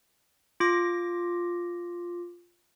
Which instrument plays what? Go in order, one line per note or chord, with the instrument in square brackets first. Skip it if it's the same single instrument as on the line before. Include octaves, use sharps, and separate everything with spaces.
[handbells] F4 D6 A#6